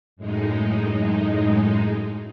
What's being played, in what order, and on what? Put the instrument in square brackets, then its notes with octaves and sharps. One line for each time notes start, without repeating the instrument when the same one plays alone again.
[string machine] F#2 A2 G#3 D#4